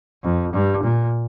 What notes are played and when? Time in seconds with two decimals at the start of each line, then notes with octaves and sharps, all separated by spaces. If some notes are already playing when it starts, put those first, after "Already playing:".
0.23 F2
0.53 G2
0.83 A#2